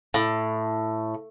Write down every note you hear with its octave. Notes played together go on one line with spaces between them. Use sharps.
A2